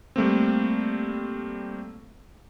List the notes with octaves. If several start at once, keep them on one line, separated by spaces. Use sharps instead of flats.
G3 A3 A#3 C4